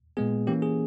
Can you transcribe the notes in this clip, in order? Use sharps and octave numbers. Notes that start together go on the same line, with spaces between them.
A#2 G#3 B3 G#4
E3 A#3 C#4 G4
G#4